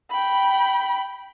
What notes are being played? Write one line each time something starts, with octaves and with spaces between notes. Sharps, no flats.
G5 B5